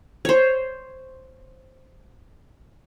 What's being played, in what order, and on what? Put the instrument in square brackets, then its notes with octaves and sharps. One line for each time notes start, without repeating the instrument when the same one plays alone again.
[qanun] C5 C#5